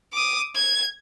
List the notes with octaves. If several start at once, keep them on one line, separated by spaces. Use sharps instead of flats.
D6 D#6
G#6